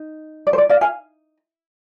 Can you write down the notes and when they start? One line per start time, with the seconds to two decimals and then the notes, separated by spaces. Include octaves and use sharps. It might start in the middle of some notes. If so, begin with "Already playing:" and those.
Already playing: D#4
0.47 D5
0.53 C5
0.58 D5
0.69 D5 F5
0.81 F5 G#5